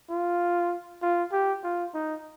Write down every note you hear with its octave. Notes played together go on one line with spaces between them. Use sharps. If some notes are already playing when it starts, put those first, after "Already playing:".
F4
F4
G4
F4
D#4